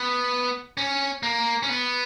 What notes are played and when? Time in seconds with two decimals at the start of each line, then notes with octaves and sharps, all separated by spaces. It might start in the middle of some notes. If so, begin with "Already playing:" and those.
Already playing: B3
0.77 C#4
1.23 A#3
1.63 C#4
1.69 B3